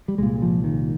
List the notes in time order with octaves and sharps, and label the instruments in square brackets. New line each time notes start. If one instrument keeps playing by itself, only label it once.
[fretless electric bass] G3
C2 A#2 G#3
F3
D#3